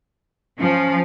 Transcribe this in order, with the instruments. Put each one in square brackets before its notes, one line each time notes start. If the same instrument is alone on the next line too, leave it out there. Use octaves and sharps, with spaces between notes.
[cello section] F3 [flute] C#4